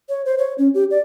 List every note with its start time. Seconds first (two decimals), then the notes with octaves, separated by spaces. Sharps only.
0.09 C#5
0.25 C5
0.38 C#5
0.58 C#4
0.74 G4
0.91 D5